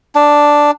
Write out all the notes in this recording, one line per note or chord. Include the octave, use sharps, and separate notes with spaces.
D4